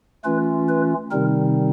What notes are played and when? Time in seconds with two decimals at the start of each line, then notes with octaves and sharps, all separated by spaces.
0.24 E3 A3 C#4 F4 B4
0.69 B4
1.11 C3 D#3 G3 C4 D#4 A#4